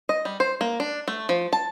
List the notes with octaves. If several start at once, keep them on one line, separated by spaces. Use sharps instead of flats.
D#5
G3
C5
A#3
D4
A3
F3
A5